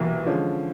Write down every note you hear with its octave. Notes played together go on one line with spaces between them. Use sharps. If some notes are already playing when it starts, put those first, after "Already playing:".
Already playing: C2 B2 E3 F#3 A#3
D3 F3 G#3 C#4